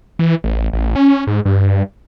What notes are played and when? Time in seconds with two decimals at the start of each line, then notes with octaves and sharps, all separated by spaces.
0.19 E3
0.44 A1
0.73 A1
0.96 C#4
1.27 G#2
1.45 G2